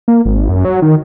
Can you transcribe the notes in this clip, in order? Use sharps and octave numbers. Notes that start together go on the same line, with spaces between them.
A#3
G#1
F#2
F#3
D#3